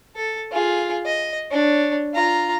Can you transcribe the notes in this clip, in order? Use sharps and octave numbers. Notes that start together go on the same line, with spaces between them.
A4
F4 G#4
D#5
D4 C#5
F4 A#5